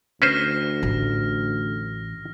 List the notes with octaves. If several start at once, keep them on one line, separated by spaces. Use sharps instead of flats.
D2 C#4 B4 C5 F6 A#6
A1